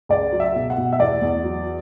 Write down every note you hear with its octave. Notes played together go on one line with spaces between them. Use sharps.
C#2 D5
F#3
E5
B2
F#5
B2
E5
E2 D5
E2
F#3